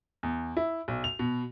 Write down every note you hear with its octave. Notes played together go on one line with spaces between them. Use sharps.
E2
E4
B1
F7
B2